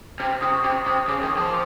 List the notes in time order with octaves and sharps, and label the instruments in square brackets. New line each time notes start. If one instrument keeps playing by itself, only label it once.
[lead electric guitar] C3 [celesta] F6
[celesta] F6
[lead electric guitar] C3 [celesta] D#6
[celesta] C#6
[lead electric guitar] C3 [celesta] D6
[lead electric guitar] C3 [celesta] D#6
[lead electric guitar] C#3 [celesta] D6
[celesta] D#6
[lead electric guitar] D#3
[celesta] D6
[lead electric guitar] F3 [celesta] C6